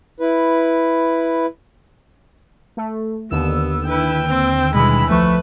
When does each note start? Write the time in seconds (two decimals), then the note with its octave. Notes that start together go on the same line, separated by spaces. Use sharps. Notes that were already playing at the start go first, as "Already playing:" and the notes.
0.20 E4 B4
2.77 A3
3.31 D#2 D3 B3 E6
3.89 E4 B4 G5
4.27 C4
4.75 B2 E3 G3 G#3 B5
5.10 C2 F3 A3 B4 C#6